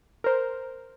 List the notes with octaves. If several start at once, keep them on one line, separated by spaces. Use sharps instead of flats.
A#4 C5